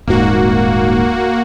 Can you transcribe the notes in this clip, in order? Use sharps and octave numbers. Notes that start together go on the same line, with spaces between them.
D#1 G#2 A#3 F#4